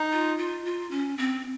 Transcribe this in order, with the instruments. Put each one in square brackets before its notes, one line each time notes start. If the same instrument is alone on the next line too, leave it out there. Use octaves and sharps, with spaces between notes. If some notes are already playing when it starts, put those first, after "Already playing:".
Already playing: [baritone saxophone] D#4
[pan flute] F4
F4
F4
C#4
C4